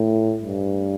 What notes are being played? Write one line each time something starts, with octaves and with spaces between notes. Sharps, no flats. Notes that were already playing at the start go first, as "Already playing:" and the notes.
Already playing: A2
G2